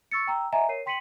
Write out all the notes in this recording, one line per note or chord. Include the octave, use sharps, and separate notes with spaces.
C#6 E6 A6 C#7
G5 A#5 E6
D#5 E5 F#5 G#5 A#5
A#4 C#5 C7 D#7
G5 C6 B6 C#7 D#7 F#7